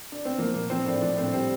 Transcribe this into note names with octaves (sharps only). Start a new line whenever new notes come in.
D4
C4
F3 A#3
A#2 A#3
F3 C4
A2 D4
F3 D4
A2 C4
G3 C4